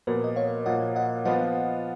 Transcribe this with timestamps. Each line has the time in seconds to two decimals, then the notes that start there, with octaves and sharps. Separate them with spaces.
0.07 A#2 F3 B3 F#4 A#4
0.24 D#5
0.36 C#5 F5
0.66 A#2 F3 A#3 F4 D#5 F#5
0.96 D#5 F#5
1.25 F3 B3 F4 D#5 F#5